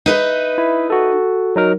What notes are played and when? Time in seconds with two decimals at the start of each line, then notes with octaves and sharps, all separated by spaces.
0.06 D#4 B4 E5
0.58 E4
0.90 F#4 A4
1.56 F#3 D#4 A#4